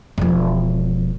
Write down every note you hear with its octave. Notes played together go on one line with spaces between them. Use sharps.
E1 F3